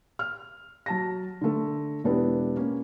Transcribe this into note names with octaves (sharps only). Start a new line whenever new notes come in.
F6
F#3 A5 A#6
D3 A3
E1 B3 D4 E4 G4
A#3 C#4